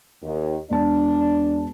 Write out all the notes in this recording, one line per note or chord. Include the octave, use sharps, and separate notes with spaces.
D#2
E1 D4 A5